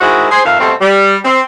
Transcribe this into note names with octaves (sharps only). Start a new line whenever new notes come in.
D#3 G#3 E4 F#4 C5 D#5
G#4 C5
F2 D#3 E5 F5
B2 G3 A3 C4
G3
C4